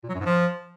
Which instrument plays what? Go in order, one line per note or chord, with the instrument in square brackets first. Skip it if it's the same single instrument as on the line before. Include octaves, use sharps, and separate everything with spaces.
[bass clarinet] A#2
F#3
F#2
G#2
F3